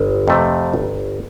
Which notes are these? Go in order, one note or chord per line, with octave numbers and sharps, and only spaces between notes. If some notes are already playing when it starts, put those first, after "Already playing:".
Already playing: G1
F2 C3 A3 C4
G1